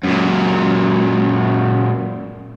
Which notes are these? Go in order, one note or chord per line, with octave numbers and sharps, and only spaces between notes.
F#2 A#2